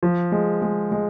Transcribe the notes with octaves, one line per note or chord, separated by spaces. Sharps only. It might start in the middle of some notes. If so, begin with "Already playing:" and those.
F3
G#3
G#3
G#3